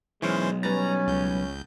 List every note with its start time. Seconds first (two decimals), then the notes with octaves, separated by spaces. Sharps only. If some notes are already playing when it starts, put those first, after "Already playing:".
0.22 B1 E3 G#3 C#4 C5
0.63 G3 C#4 B4 A#5 A6
1.07 C#2 G6